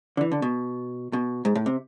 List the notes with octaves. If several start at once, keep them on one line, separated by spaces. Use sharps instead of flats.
D3
E3
D3
B2
B2
G#2
A2
C3